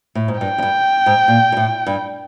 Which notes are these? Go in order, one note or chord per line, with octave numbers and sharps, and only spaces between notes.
A2
G#2
G2 G5
F#2
G2
G#2
A#2
A#2
A2
G2